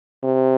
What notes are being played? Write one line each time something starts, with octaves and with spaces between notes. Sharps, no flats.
C3